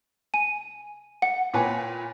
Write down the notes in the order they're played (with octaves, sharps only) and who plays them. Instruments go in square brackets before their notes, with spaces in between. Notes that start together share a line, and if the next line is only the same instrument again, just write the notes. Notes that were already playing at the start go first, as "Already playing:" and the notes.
[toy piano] G#5 [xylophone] D#7
[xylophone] F#5
[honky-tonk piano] A#2 B4 C#5 [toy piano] G5 G#5 D6